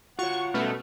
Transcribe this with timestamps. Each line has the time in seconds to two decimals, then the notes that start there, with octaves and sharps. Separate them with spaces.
0.19 F4 F#4 C#5 F#5 C#6
0.54 B2 G3 A3 C#4 F#4 B4 F6